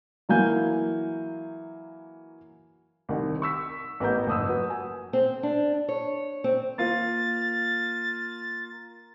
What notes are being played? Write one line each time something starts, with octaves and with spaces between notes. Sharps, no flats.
E3 F#3 A#3 F5 G#5 G6
C2 C3 D#3
C#6 E6 B6
A1 B3 A#4 A#5 G6
F#1 G#2 D#6 E6
F#3 B4
G#5
C4
D4
C#5
C4
A#3 F4 A6